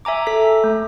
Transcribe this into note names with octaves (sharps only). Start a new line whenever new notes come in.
E5 G#5 A#5 D6
A4 B6
A3